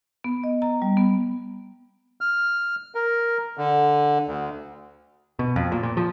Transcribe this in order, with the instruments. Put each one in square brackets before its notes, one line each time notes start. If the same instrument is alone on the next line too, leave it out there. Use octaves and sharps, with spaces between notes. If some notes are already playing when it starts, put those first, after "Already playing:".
[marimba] B3
D#5
A#5
G3
B3
[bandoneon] F6
A#4
D3
D2
[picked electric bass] B2
F2
A#2
A#2
F3